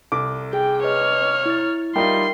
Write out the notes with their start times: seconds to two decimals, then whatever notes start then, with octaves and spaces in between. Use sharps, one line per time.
0.12 C2 A4 D6
0.53 G#4 G5
0.83 B4 C#5 D#5 F6
1.46 E4 A6
1.96 G3 D#4 F4 A#4 E5 G5 C6